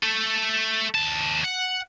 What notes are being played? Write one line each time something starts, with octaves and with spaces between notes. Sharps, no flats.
A3 A4
D#2 A5
F#5